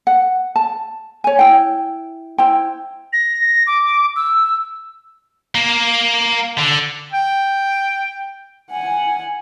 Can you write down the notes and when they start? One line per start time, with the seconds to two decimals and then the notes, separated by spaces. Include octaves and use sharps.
0.07 F#5
0.56 A5
1.24 C#5 G#5
1.39 E4 G5
2.38 E4 C5 G5
3.13 A#6
3.67 D6
4.16 E6
5.55 A#3
6.58 D3
7.12 G5
8.71 F#5 G#5